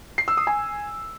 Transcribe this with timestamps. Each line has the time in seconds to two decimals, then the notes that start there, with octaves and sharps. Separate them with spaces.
0.18 C7
0.28 E6
0.37 D#6
0.47 G#5